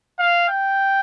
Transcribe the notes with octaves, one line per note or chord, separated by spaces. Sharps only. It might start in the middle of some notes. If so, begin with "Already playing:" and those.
F5
G5